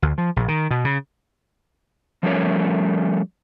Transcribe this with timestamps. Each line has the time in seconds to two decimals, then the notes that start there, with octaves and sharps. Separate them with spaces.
0.02 D2
0.18 F3
0.36 A#1
0.48 D#3
0.71 B2
0.85 C#3
2.23 F3 G3 A3 C#4 A#4 C#5